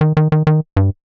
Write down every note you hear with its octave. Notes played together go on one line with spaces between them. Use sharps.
D#3
D#3
D#3
D#3
G2